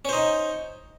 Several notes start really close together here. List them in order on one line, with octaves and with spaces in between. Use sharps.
C#4 C5 D#4